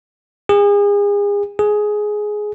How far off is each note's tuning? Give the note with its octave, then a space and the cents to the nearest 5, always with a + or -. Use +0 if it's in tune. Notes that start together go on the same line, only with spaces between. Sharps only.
G#4 -35
G#4 +10